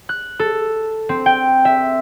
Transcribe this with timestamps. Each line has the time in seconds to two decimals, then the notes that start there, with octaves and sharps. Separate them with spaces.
0.09 F#6
0.39 A4
1.09 C4
1.26 G5
1.65 E5